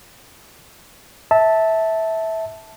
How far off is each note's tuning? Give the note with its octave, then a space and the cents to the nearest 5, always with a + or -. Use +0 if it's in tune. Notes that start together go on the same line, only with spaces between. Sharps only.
E5 -20 A5 +0